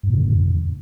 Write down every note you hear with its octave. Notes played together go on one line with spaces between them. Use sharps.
G2
B2
D3
A2
F2